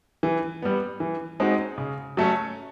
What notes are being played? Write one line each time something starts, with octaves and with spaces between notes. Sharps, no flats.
E3
G3 B3
E3
G#3 C4 D#4 F#4
C#3
F#3 A3 C#4